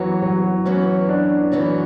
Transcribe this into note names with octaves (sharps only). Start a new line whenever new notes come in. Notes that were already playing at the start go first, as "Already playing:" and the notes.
Already playing: F#2 E3 F#3 B3 F#4 C#5
F#3
F#2 E3 B3 C#4 F#4 C#5
D4
F#2 E3 B3 F#4 C#5